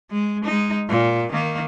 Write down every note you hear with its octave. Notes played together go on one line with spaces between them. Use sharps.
G#3
G#3 D#4
A#2
D#3 A#3